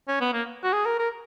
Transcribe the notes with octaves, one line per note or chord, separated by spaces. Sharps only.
C#4
B3
A#3
F#4
G#4
A#4
A#4